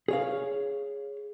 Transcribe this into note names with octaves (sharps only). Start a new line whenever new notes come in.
G#4 C#5 F5